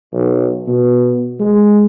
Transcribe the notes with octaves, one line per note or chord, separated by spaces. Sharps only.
B1
B2
G#3